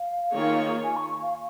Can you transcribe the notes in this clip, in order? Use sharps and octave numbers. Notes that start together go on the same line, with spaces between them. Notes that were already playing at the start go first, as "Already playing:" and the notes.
Already playing: F5
D#3 A#3 F4 G#4 C#5
G#5
C#6
C#6
F5